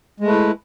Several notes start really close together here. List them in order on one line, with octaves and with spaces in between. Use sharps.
G#3 A3 B4 E4